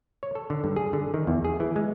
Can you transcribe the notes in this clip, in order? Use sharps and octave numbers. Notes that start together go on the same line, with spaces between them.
C#5
A4
D3
G2
G#4
D3
D#3
E2
G#4
E3
G#3